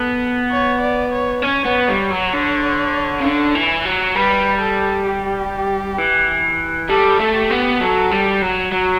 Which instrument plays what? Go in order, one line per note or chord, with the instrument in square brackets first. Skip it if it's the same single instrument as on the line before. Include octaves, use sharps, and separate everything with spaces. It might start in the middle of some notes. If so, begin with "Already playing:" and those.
Already playing: [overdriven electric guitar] B3 [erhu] A4
[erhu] C#5
D5
C#5
[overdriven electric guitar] C#4 [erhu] C#5
[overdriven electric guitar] B3
[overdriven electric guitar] G3 [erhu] C#5
[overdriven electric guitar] F#3
D3
C#3
D3
E3
F#3
[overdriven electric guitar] G3 [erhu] B4
[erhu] A4
G4
[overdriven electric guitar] E3
[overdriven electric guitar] G3 [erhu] A4
[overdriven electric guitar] A3
[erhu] G4
[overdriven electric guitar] B3
[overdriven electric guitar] F#3 [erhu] A4
[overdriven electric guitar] G3
F#3
F#3